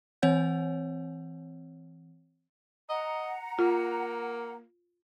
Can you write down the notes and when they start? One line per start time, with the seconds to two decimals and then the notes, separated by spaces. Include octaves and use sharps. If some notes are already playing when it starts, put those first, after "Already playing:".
0.22 E3 C4 C#5 F#5 G6
2.89 D#5 F#5 A#5
3.59 A#3 F4